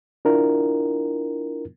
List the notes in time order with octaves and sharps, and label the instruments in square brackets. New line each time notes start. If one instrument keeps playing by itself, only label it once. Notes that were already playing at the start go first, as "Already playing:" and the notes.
[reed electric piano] D4 E4 F4 A#4